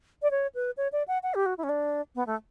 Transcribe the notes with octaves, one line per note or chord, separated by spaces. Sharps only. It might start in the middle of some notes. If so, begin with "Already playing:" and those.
D5
C#5
B4
C#5
D5
F#5
F#5
G4
F#4
E4
C#4
D4
B3
A3